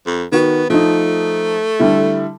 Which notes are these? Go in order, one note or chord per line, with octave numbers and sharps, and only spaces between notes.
F2
D#3 B3 F#4
F3 A3 D#4
D3 G3 E4